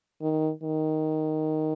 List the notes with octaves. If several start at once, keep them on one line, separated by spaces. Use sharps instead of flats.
D#3
D#3